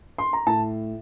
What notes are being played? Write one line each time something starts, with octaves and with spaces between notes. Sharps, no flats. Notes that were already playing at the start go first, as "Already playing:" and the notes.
C6
A#5
A2 A5